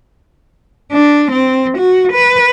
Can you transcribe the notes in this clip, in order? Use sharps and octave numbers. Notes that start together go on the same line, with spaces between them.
D4
C4
F#4
B4